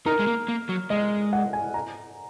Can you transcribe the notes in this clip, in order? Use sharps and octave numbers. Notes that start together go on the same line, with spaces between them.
D#4 A#4
G#3
A#3
A#3
F#3
G#3 D#5
F#5
G#5
A#5